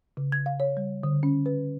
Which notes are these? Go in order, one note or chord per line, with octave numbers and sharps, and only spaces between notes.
C#3
G#6
F5
C#5
G3
D3
C#4
B4